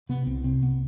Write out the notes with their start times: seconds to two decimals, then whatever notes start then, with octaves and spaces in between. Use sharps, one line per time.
0.09 C3 B3
0.26 C2 C4
0.44 C3 C4
0.62 C2 B3